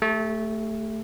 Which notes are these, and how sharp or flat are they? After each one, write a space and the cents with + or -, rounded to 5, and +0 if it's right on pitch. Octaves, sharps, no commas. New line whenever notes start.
A3 +5 G4 +45